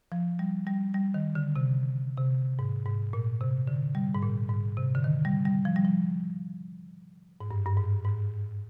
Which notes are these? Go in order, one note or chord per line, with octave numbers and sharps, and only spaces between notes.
F3
G3
G3
G3
D#3
D3
C3
C3
G#2
G#2
A#2
C3
D3
G3
G#2
A#2
G#2
C3
D3
D#3
G3
G3
F3
G3
F3
G#2
G2
G2
G#2
G#2